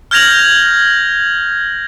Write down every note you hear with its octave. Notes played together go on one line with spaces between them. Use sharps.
F6 G6 G#6 A#6 F7 F#7